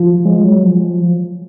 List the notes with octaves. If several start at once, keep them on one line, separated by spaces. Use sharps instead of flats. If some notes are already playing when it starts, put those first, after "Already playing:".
Already playing: F3
G#3
F#3
F3